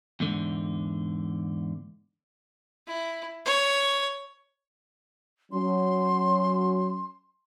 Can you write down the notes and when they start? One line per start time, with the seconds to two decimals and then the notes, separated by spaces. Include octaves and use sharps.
0.20 E2 G#2 D3
2.87 E4
3.45 C#5
5.52 F#3 C#4 C6